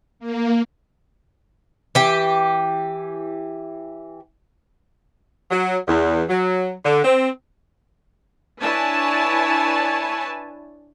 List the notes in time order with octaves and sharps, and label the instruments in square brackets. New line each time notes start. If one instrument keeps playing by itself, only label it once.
[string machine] A#3
[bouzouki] E3 G4
[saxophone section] F#3
E2
F#3
D3
C4
[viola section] D4 E4 B4 C#5 G#5 A5